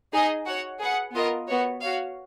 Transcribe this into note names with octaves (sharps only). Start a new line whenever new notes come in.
D#4 G#4 D#5 G#5
F#4 C#5 F#5
G#4 B4 F#5
B3 F4 A#4 D#5
B3 F#4 C#5
F#4 C#5 F5